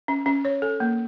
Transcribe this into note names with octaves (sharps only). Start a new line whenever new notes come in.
C#4
C#4
C#5
A4
A#3